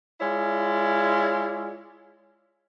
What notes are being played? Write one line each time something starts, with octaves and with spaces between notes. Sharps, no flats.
G#3 E4 F4 C#5 D5